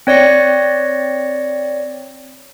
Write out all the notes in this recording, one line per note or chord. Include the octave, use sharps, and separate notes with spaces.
C4 C#5 D5 A#6 C#7